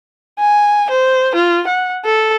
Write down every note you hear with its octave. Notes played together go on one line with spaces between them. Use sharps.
G#5
C5
F4
F#5
A4